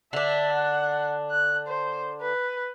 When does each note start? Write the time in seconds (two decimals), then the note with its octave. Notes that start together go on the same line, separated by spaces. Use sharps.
0.13 D3 D4 E5
0.53 F#5
1.30 F#6
1.67 C5
2.22 B4